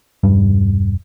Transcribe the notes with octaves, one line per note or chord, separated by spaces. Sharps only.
E1 G2 G3